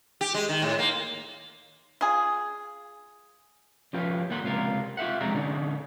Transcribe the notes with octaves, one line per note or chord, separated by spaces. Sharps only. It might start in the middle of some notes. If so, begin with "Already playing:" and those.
G4
G#3
D#3
A2
A#3
F4 G#4
F3 C#4 F4 G4 B4
D#2 G3 A#3 F#5 C6
C#2 C3 F4 A#4
F4 G4 E5 F#5
F2 C3 G#3 D5 E5 A#5
D3 C#4 D#4